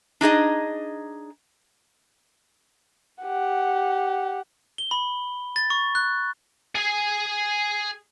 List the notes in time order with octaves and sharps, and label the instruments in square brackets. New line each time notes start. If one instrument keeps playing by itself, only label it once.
[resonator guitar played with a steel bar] D4 D#4 G#4 D#5
[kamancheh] G4 F#5
[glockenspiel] G7
B5
A6
C#6
F#6
[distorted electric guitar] G#4 G#5